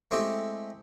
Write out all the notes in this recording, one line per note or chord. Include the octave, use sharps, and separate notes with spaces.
G#3 A3 C4 E4 G4